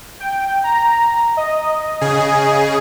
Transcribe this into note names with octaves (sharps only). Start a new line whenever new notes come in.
G5
A#5
D#5
C#3 G#4